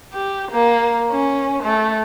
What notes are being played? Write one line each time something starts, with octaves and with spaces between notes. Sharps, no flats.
G4
A#3
C#4
A3